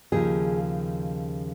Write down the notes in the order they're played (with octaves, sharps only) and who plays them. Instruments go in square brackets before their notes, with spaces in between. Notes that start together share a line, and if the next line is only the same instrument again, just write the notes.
[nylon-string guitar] D#2 C#3 F3 G#4